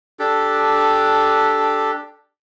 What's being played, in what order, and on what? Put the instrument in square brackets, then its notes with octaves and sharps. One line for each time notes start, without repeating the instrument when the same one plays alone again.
[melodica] D4 G4 A4